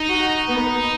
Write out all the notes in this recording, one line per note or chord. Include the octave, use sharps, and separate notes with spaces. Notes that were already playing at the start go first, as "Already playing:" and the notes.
Already playing: D#4
F#4
B3